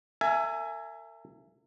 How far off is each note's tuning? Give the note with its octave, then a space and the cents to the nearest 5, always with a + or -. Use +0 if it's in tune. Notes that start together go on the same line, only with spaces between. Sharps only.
A#4 -40 E5 +25 G#5 +10